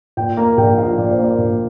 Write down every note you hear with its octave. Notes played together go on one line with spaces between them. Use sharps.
A#2 G5
A#3 A#5
A#1 G5
F3 F5
A#2 D5
C5
A#3 D5
A#1